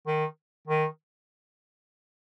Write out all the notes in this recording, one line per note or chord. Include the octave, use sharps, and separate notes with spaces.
D#3
D#3